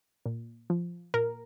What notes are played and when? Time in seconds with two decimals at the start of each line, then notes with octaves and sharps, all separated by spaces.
0.26 A#2
0.70 F3
1.14 A#2 A#4